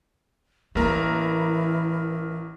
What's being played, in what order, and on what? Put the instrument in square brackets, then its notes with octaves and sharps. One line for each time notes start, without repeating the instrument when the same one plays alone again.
[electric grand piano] A1 A#4 A#5 [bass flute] E3 [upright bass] A#3